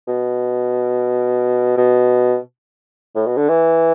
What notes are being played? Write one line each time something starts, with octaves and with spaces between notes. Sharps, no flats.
B2
B2
A2
B2
D3
E3